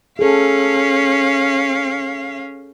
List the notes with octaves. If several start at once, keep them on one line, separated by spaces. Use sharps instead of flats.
C#4 G#4 A4 F5